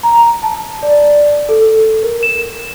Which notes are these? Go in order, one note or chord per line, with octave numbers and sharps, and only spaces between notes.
A#5
A5
D5
A4
A#4
E7